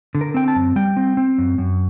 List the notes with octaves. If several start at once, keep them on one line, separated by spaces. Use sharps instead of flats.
D3
A#4
C4 G5
A5
F#2
G3 G5
C4
C4
F#2
F#2